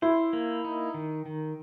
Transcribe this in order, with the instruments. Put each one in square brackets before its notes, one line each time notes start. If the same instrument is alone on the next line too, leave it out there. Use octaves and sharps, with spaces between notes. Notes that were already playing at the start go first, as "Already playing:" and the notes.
[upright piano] E4 [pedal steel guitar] C5
[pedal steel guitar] A#3
D#4
D#3
D#3